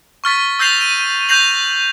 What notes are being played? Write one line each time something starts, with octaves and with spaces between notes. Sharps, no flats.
C#6 F6 A6 B6
E6 G6 A#6 C7 F7
D#7
G6 A#6 C7 F7 F#7